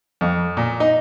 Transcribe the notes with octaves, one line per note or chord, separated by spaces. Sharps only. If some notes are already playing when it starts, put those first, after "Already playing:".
F2
A#2
D#4